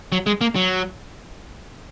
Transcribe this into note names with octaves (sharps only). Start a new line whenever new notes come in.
F#3
G#3
A#3
F#3